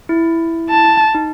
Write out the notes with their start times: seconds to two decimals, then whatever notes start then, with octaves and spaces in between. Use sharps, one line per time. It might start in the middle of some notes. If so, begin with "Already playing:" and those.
0.09 E4
0.70 A5
1.15 D#4